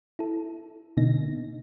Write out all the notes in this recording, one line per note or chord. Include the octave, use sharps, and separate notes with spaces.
E4 A4
B2 D3 A#3 D#4 A#6